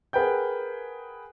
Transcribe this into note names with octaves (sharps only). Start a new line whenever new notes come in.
G#4 A#4 B4 F#5 G5 G6